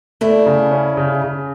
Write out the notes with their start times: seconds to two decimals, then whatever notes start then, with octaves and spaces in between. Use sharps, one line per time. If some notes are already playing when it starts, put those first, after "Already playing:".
0.21 A3 D4 E4
0.46 C#3
0.71 C#4
0.97 C#3
1.22 C#3